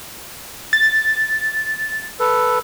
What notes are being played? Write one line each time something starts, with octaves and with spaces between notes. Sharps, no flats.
A6
A4 B4